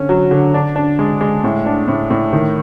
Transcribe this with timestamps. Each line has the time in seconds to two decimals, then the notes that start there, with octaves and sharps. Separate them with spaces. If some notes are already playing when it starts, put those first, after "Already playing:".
Already playing: D3 C#4
0.09 F#3
0.31 D3
0.54 D4
0.76 D4
0.99 G#3
1.21 G#3
1.44 A2
1.66 D4
1.88 A2
2.10 A2
2.33 D#3